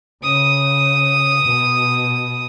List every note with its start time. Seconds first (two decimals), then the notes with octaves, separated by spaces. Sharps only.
0.24 C#3 D#6
1.44 B2